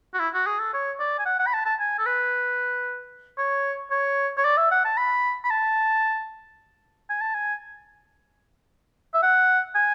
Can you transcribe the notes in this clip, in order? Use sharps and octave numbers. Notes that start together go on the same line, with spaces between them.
F#4
E4
F#4
G#4
A4
C#5
D5
G#5
F#5
F#5
B5
A5
A5
G#5
A4
B4
C#5
C#5
C#5
D5
E5
F#5
A5
B5
B5
A5
G#5
A5
G#5
E5
F#5
G#5